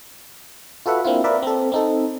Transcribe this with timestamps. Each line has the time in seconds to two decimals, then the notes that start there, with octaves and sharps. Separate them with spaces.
0.86 F4 F#4 A4 B4 E5 F#5
1.04 A#3 C4 D4 E4 F4
1.24 A#4 B4 D5 E5
1.43 C4 A4
1.72 C4 D#4 A4